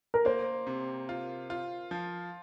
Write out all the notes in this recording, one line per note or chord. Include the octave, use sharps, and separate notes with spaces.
A#4
A#3 C5
C3
F4
F4
F3